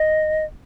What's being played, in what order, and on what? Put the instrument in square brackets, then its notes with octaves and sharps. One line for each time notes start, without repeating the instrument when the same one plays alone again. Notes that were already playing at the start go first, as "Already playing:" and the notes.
Already playing: [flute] D#5